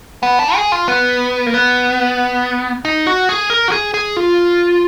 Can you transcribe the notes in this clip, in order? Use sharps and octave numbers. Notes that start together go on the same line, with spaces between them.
B3
D4
G#4
F4
B3
A#3
B3
D#4
F#4
G#4
A#4
F#4
G#4
G#4
F4